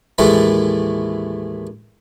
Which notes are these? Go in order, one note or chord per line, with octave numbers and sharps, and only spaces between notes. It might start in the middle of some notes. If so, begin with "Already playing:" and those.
D#2 A2 E3 G#3 A3